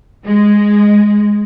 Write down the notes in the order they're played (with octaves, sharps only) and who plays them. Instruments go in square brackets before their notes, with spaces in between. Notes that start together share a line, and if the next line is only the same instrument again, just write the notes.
[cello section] G#3